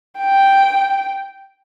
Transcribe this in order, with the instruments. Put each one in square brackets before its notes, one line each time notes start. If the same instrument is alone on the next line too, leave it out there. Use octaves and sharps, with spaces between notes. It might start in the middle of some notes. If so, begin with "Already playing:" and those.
[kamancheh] G5